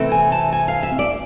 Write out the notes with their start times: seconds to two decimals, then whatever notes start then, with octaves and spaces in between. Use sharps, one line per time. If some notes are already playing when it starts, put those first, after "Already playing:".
Already playing: C3 E3 A3 C4
0.12 G#5
0.32 A5
0.53 G#5
0.68 F5
0.83 E5
0.99 D5